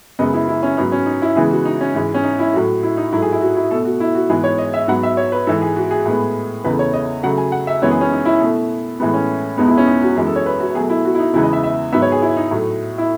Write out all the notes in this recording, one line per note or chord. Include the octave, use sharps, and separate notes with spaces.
F#2 C#3 G#3 B3 D#5
E4
E4
C#4
G#2 F#3 B3 D#4
C#4
D#4
E4
C#3 E3 G#3 B3 G#4
F#4
D#4
C#4
G#2 E3 G#3
C#4
D#4
E4
A2 F#3 A3 F#4
E4
D#4
G#2 F#3 A3 E4
G#4
E4
F#4
E4
B2 A3 A4
F#4
E4
F#4
G#2 E3 G#3 B3 G#4
C#5
D#5
E5
G#2 F#3 B3 F#5
E5
C#5
B4
G#2 E3 G#3 A4
G#4
F#4
G#4
A2 G#3 B3
E2 C#3 E3 A3 B4
C#5
D#5
C#3 F#3 A3 F#5
G#5
F#5
E5
F#2 E3 G#3 B3 C#5
G#4
C#4
D#4
E4
B2 A3
A2 E3 G#3 B3
C#4
E2 B2 G#3 B3 D#4
E4
C#4
D#4
F#4
F#2 E3 G#3 G#4
A4
C#5
B4
F#4
B2 F#3 A3 G#4
E4
F#4
E4
D#4
E2 C#3 E3 G#3 B3 E4
D#5
E5
E5
G#2 D#3 F#3 B3 E5
C#5
G#4
E4
D#4
A2 F#3 A3
E4